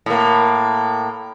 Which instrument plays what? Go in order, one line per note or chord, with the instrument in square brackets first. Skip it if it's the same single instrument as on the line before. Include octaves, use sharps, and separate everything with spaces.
[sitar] A2 A#3